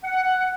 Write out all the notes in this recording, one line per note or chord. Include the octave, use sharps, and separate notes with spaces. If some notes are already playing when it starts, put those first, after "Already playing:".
F#5